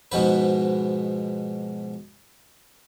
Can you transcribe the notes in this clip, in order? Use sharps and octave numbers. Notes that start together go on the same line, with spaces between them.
G#2 B2 F3 B4